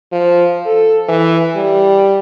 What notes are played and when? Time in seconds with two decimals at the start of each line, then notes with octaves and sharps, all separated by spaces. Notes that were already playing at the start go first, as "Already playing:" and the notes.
0.12 F3
0.66 A4
1.09 E3
1.56 G3